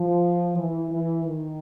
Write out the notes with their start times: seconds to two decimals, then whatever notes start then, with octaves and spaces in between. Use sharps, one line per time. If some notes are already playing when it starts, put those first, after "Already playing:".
Already playing: F3
0.57 E3
0.91 E3
1.26 D#3